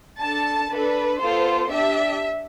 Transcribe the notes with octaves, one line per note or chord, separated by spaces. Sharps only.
D4 A4 A5
D4 A4 B4
B3 F4 A4 C5
D4 G4 E5